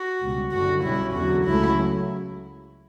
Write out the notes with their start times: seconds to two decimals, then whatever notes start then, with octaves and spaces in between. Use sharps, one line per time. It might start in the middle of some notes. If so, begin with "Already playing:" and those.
Already playing: F#4
0.21 C#2 B2 G3
0.52 F#1 F#2 D3 G3 F#4
0.83 B1 B2 G3 C#4 E4
1.14 E2 D3 F#3 F#4
1.46 C#2 C#3 F#3 A3 C#4 E4